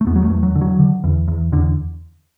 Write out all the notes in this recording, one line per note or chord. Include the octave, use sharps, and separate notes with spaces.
A3
E2 B3
F#3
A3
E2
F#3
D3
F#3
D3
E2
E2
E2 D3